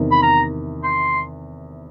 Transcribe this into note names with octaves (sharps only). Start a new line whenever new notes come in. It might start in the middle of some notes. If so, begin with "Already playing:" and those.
Already playing: E2 C3 D#3
B5
A#5
C6